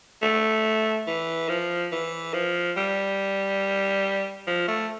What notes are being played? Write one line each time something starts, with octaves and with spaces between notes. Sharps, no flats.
A3
E3
F3
E3
F3
G3
F3
A3